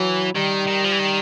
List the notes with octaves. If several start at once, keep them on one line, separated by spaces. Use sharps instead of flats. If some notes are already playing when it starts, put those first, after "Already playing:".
Already playing: E3 F#3
D#3 G3
D#3
F3
E3
D#3